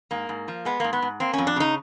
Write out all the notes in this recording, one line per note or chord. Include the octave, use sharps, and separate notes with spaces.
G#2 A#3
G#2
F3
G#3 B3
G#2 A#3
B3
G#2
A#3 C4
F2 C#4
D4
C#3 D#4